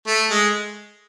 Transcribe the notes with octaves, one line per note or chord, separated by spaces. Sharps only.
A3
G#3